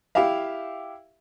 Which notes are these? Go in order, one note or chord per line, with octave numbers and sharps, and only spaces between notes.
E4 G4 E5 F5